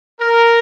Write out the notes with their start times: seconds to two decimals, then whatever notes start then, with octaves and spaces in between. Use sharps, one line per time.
0.21 A#4